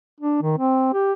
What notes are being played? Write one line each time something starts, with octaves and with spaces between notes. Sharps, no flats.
D4
D#3
C4
G4